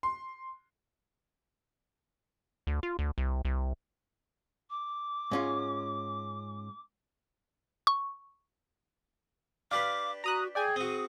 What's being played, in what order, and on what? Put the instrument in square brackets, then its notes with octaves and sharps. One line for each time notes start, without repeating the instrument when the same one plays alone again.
[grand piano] C6
[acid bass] D2
F4
D2
C2
C2
[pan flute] D6
[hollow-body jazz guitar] G#2 C#4 F4
[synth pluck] C#6
[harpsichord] D4 G4 B4 [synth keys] F5 [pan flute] D6
[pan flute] F#4 [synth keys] A#5 D#6 F#6
[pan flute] G#4 [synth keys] D5 G5 G#5
[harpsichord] C4 F#4 [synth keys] D#6